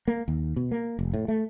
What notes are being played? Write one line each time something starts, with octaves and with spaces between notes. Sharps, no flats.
A#3
D#2
B2
A#3
F1
A2
A3